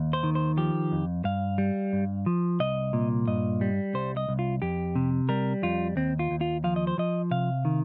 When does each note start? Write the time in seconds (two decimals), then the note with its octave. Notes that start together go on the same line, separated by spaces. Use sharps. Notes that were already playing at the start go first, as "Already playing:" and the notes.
Already playing: D#2
0.13 C5
0.23 D#3
0.35 C5
0.57 F3 G4
0.92 F2
1.24 G2 F5
1.58 G3
1.93 G2
2.26 F3
2.60 C2 D#5
2.93 A#2
3.27 G2 D#5
3.61 G3
3.94 C2 C5
4.17 D#5
4.29 C2
4.39 F4
4.62 F2 G4
4.96 C3
5.29 G3 A#4
5.63 F2 F4
5.96 D#2 C4
6.19 F4
6.31 D#2
6.41 F4
6.64 F3 F5
6.76 D#5
6.87 C5
6.98 F3 D#5
7.31 C3 F5
7.65 D#3